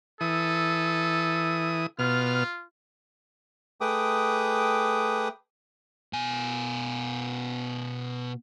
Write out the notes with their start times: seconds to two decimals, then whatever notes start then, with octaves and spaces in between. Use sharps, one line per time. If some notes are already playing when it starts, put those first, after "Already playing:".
0.21 E3 A4 D#6
1.99 B2 F4 F6
3.81 A3 G#4 B4 G5 D6 D#6
6.13 B2 G#5